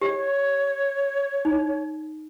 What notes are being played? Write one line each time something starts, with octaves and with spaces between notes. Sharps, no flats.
G4 C#5
D#4